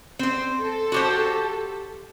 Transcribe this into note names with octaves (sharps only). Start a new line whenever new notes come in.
C4 C5
A4
F#4 G4 C5